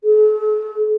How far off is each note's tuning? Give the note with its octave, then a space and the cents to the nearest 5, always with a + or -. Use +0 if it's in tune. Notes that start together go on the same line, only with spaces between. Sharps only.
A4 -45